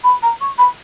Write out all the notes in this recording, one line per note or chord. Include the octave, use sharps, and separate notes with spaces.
B5
A#5
C#6
B5